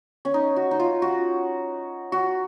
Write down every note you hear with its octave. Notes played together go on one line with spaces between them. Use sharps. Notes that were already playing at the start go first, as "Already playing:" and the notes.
C#4
D#4
F#4
D#4
F4
F#4
F#4